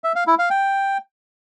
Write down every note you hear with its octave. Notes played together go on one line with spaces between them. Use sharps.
E5
F5
E4
F5
G5